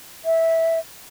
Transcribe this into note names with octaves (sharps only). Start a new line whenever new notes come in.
E5